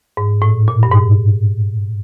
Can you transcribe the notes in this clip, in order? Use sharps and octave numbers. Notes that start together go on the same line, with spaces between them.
G#2
A2
A#2
G2
G#2